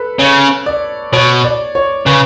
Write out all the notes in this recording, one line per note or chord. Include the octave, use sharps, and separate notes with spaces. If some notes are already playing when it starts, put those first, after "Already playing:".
Already playing: A4 B4
C#3 C#5
D5
B2 C#5
D5
C#5
C#3 B4